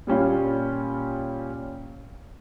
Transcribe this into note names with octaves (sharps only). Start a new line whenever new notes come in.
A#2 G3 C#4 F4